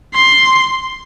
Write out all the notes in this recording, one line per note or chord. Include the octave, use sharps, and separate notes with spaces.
C6